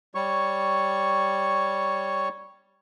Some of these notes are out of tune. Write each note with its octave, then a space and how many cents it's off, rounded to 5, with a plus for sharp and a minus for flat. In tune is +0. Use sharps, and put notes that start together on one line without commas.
G3 +0 C#5 -5 C#6 +0